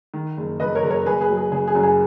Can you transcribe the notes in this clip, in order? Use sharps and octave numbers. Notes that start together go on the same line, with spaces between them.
D#3
F#1
F#1 B4 D#5
A#4 C#5
F#1
A#4 C#5
F#1 G#4 B4
G#4 B4
F#3
G#4
C#3 G#4
G#4
F#2
G#4